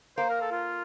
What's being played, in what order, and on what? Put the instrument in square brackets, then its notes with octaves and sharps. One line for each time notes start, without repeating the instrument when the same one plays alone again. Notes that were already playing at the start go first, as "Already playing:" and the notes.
[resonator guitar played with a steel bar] A#3 [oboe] C5
[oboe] A#4
A4
F4